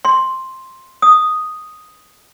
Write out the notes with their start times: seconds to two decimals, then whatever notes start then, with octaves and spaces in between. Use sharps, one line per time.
0.05 C6
1.02 D#6